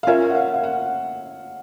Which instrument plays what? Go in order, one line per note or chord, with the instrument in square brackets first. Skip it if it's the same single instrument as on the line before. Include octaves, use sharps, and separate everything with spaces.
[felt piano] F5
[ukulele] C#4 F4 A#4 [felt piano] E5
[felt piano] F#5
F5
F5
F#5